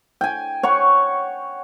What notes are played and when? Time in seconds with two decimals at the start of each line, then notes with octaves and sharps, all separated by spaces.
0.21 G5 G#5
0.63 C#5 F#5 C#6